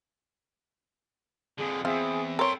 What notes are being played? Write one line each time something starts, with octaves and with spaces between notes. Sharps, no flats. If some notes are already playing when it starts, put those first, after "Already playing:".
F2 D3 G#4
E2 C4 F4 G#4 E5
A4 A#4 C#5 G5 C6